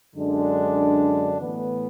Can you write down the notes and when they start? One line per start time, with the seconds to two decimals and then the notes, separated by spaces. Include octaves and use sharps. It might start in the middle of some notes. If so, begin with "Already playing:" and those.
0.16 F#2 D3 G#3 D4
1.40 A2 E3 B3